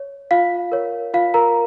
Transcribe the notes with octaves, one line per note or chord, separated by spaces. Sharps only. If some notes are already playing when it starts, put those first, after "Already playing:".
Already playing: C#5
F4 F5
A#4 C#5
F4 F5
A#4 A#5